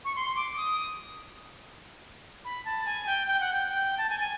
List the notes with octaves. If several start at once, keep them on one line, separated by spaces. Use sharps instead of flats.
C#6
C6
D6
D#6
B5
A5
G#5
G5
G5
F#5
G5
G5
A5
G#5
G#5